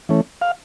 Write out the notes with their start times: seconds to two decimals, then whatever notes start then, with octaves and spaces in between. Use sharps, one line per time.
0.09 E3 A3 C#4
0.42 F5